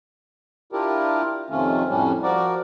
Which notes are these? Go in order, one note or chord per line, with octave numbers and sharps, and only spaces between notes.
D4 E4 F4 G4 A#4
F2 C3 D#3 A3 C#4 F4
F2 A2 G3 C#4 D4
F3 F#4 A#4 D5